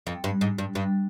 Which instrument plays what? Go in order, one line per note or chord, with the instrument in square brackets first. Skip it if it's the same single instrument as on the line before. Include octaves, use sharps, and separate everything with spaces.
[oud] F2
G2
G#2
G2
G2